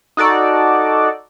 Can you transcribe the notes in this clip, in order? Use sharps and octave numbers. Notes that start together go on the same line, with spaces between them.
D#4 F#4 A4 D5